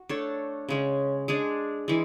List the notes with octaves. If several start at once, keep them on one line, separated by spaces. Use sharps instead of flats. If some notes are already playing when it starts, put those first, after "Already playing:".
Already playing: F#4
A3 D4 A4 C#5
C#3 G#3 C#4
G#3 D4 G#4
E3 G#3